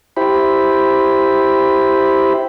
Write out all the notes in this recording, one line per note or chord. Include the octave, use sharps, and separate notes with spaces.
E4 G4 C5 B5